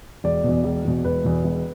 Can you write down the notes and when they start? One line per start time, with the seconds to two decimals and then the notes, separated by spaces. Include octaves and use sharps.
0.24 E1 D5
0.44 E2 B2
0.64 E1
0.85 E2 B2
1.05 E1 B4
1.24 E2 B2
1.44 E1